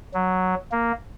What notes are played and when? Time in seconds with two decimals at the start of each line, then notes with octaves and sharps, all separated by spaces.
0.14 F#3
0.72 A#3